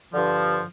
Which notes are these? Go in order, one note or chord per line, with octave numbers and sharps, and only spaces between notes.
G2 D3 F3